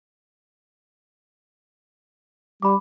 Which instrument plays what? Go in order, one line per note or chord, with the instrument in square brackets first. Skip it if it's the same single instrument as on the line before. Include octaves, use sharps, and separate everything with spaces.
[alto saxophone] G3 [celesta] B5 D6